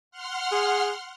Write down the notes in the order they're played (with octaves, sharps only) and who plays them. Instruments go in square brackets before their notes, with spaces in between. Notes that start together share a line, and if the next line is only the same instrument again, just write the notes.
[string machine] F#5 C6 F6
[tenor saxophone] G#4